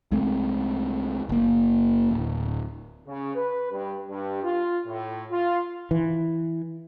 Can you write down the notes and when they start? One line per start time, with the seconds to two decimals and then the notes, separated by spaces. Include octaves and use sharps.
0.11 C2 G#3 A3 C4
1.29 F#1 A#3
2.11 D1
3.07 C#3
3.36 B4
3.71 G2
4.09 G2
4.43 F4
4.86 A2
5.31 F4
5.91 E3